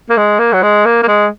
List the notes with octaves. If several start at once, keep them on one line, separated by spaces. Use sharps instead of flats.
A#3
G#3
A#3
F#3
G#3
A#3
A#3
G#3